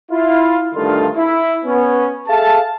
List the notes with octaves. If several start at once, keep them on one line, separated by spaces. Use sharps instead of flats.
E4 F4
G2 D3 D#3 A3 D#4 F4
E4
B3 C#4
G#4 A4 E5 F5 A5